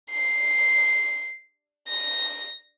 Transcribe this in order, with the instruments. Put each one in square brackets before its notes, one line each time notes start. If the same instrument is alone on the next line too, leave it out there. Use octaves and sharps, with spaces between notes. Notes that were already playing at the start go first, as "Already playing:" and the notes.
[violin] C7
A#6